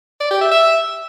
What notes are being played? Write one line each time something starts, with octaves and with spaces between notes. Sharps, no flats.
D5
G4
E5
E5